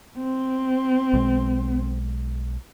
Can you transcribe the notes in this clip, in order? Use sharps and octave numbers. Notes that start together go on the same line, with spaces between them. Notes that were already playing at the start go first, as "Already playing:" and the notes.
C4
B1 B2 G#3